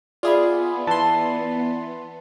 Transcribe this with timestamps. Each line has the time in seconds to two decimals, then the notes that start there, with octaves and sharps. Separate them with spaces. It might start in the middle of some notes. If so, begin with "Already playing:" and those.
0.23 B3 F4 G#4 D5 E5 B5
0.87 E3 A5 C6